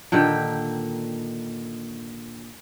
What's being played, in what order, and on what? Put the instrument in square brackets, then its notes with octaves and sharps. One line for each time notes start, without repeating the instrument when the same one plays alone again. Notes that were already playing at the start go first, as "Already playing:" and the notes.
[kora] A#2 D3 D#3 G4